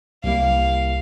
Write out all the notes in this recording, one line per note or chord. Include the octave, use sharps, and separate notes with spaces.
C2 G3 A#3 E4 F5